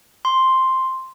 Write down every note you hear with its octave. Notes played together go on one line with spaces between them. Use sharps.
C6